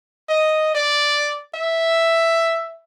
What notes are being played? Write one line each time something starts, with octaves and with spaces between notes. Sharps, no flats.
D#5
D5
E5